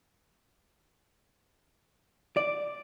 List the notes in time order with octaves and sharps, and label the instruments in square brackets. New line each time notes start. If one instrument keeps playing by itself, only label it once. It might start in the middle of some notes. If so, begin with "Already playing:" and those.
[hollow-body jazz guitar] D5